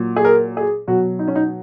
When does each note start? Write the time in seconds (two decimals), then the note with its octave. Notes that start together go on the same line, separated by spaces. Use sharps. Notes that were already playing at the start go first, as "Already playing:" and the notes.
Already playing: A#2 F#3
0.16 G#4
0.25 A#4
0.57 G#4
0.88 B2 F#3 F#4
1.19 D#4
1.28 C#4
1.36 D#4